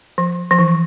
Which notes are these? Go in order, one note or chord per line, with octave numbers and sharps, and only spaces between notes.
F3
F3
E3